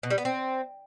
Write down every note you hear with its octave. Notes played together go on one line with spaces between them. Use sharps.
B2
G3
B3
C4